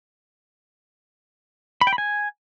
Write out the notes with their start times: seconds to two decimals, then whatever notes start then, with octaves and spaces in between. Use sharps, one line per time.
1.81 B5
1.87 G5
1.93 B5
1.98 G#5